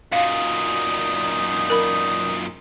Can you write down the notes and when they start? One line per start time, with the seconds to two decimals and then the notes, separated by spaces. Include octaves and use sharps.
0.12 F#2 A#2 D#4 F5
1.70 A#4 B5